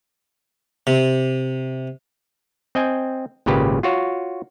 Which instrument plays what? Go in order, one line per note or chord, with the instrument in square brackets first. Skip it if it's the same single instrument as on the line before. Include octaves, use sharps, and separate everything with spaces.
[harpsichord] C3
[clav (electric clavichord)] C4 D#5 G5 G#5
G#1 A#2 C#3 G4 B4
F4 F#4 C#5